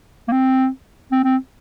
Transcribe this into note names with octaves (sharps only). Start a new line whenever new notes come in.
A#3
C4
C4
C4